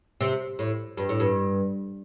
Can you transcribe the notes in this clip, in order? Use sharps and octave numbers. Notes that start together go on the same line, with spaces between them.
C3
A2
G2
A2
G2